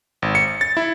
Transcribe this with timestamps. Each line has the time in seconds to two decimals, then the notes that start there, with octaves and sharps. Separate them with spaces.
0.22 G#1
0.35 C#7
0.61 A6
0.77 E4